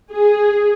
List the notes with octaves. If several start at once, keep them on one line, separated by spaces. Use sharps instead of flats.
G#4